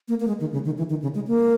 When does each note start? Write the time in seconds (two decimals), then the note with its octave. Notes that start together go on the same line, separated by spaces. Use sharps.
0.08 A#3
0.20 A#3
0.27 G#3
0.40 D#3
0.53 C#3
0.65 D#3
0.78 E3
0.90 D#3
1.02 C#3
1.15 G#3
1.27 A#3